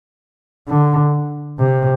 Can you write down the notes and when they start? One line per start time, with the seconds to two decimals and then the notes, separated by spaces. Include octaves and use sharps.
0.69 D3
1.59 C3